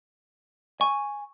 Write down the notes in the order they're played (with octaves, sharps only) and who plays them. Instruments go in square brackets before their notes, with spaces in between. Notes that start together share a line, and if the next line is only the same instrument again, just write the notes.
[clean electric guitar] G#5 [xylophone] C#6